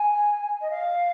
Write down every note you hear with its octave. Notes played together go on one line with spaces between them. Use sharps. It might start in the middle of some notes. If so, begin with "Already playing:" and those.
Already playing: G#5
D#5
F5